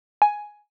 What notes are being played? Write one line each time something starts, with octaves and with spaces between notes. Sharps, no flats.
G#5